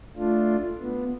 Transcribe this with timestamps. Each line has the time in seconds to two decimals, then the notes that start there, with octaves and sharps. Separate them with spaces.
0.16 A3 D4 F4
0.80 B3